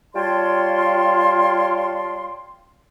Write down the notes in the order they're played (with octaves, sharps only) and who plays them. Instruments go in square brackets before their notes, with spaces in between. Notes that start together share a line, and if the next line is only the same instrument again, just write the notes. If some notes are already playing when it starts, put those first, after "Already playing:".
[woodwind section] G3 F4 C#5 G5 A5 C6